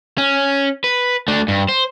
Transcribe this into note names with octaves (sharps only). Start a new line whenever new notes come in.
C#4
B4
A3 D4
G2
C5